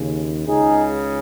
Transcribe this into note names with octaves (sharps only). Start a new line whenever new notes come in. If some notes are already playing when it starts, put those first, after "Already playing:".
Already playing: D#2 C#3
C#2 C#3 D#4 G#4